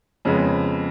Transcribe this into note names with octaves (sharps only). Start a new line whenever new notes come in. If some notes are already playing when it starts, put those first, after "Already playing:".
F2 C#3 G#3 B3